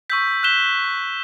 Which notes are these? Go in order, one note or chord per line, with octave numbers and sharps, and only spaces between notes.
C#6 E6 G6 B6
F#6 B6 E7 G7